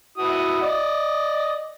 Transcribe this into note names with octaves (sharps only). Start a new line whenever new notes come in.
E4 F#4 D#6
D5 D#5